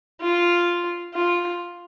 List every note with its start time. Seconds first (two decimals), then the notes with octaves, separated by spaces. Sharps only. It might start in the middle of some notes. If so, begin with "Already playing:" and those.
0.21 F4
1.14 F4